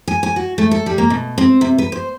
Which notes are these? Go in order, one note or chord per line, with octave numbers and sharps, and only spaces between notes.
G#5
G#5
F#4
A3
A4
G3
A#3
B2
C4
C3
B4
C5